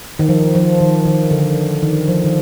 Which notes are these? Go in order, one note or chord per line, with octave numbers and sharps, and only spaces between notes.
D#3
F3
F3
D#3
D#3
D3
D#3
F3
D#3